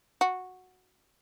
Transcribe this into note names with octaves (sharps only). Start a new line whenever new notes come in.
F#4